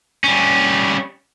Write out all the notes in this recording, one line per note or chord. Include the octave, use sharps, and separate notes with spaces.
G3 C#4